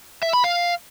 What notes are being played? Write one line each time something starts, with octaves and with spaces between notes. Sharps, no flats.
E5
B5
F5